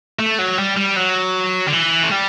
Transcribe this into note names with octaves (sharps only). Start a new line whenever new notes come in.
A3
F#3
G3
G3
F#3
D3
E3
A3
G3